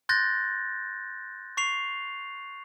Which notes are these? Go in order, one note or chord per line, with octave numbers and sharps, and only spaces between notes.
C6 F#6 G6 A6 A#6
C#6 C7 F7